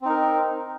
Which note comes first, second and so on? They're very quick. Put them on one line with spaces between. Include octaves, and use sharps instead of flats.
C4 D#4 A#4